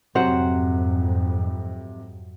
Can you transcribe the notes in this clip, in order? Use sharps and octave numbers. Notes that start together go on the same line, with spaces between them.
F2 G#2 C3 F#3 C5 F#5